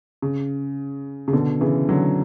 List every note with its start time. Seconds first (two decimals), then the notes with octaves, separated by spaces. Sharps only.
0.22 C#3
1.28 C#3
1.33 B2 D3
1.61 C#3 E3
1.89 D3 F#3